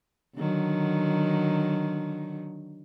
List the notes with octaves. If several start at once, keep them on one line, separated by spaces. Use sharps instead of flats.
D3 D#3 F#3